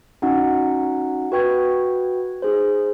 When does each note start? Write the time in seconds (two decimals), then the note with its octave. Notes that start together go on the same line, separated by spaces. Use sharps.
0.22 C#4 D#4 F#4 F#5
1.32 F#4 B4 G5 C#6 G#6
2.42 D#4 G#4 C5